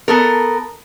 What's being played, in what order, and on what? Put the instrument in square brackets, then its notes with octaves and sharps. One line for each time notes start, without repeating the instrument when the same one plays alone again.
[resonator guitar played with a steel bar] B3 A4 A#4